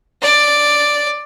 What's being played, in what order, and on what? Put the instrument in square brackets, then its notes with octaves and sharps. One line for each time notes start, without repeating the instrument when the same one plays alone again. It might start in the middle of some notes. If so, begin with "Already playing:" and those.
[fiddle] D5